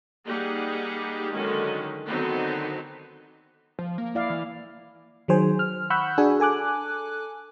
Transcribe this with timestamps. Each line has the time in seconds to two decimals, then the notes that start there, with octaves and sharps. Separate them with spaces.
0.26 G3 A#3 D#4 G4 G#4 F#5
1.32 D3 D#3 F#3 G#3 C#4
2.07 D3 D#3 F#3 B3 C4 D#4
3.79 F3
3.98 A#3
4.15 E4 D5 F5
4.30 E3
5.28 D#3 F#3 G#4 C5 G#5
5.59 F6
5.90 F#5 B5 C#6 E6 F#6 G6
6.18 D4 F#4 G#4 G#5
6.40 A4 G#5 D6 F#6